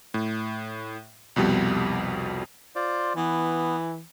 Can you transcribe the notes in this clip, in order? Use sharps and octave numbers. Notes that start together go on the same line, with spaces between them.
A2
C2 F2 B2 G3
F4 C5 D5
E3 B3